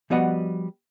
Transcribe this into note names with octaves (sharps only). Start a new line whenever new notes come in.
F3 G3 B3 F#4 D#5 F#5